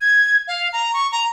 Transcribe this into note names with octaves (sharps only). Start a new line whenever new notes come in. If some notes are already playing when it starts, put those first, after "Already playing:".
G#6
F5
A#5
C#6
A#5